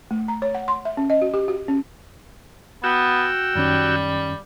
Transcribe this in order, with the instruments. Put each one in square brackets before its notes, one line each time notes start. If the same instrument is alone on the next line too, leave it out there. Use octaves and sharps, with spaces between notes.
[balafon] A3
A#5
C#5
F#5
C6
E5
C#4
D#5
F#4
G4
F#4
C#4
[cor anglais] B3 [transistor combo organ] F#4 G5 E6
[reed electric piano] F#2 D#3 C#4 [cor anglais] G3